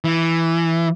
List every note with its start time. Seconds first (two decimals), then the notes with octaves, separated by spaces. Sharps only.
0.04 E3